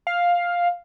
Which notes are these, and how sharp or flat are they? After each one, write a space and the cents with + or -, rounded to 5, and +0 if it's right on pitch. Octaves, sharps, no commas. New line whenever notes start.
F5 +5